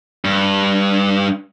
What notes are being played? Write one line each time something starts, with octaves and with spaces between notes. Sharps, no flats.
G2